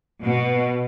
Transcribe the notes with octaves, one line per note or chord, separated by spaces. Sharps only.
B2